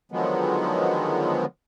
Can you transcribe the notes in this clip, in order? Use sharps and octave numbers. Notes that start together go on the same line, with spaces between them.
D3 D#3 F3 F#3 G#3 B3